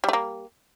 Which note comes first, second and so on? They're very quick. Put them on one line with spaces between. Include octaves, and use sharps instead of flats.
G3 A3 A#3